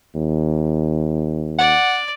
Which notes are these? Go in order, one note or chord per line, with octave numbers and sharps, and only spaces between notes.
D#2
D5 F#5